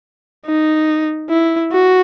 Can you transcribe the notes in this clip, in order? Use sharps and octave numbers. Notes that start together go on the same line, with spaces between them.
D#4
E4
F#4